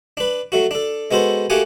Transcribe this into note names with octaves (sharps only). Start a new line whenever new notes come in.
D4 B4
F#3 A3 F#4
D4 A4
G#3 B3 F#4 A4 C5
A3 A#3 F#4 G4 F#5 G#5